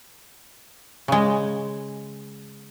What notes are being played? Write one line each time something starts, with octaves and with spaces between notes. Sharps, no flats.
C#3 G#3